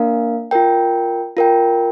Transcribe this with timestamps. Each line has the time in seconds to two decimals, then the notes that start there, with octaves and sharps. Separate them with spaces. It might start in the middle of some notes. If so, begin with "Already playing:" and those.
Already playing: A#3 D4 A#4 F5
0.51 F4 A#4 G5
1.37 F4 A#4 G5